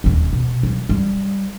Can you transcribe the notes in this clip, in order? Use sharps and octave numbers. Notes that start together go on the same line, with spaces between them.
D#1 D#2
B2
F#3
G3